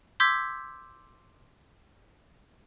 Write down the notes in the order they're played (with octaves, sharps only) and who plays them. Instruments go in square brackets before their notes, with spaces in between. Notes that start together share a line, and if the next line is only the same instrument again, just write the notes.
[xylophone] C6 D6 E6 G6 G#6 B6